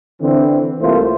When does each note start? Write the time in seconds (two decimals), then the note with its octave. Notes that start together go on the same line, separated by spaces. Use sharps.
0.21 D3 E3 C4
0.82 C2 E3 A3 A#3 F4 C5